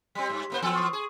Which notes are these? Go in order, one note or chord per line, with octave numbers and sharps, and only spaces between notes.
G3 C4 G4 C6 B6
G2
A2 A#3 C5
E3 B3 A4 G#5 E6
C#6 D#6 C7
G#4